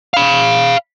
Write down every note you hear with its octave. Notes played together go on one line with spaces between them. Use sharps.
F5 B5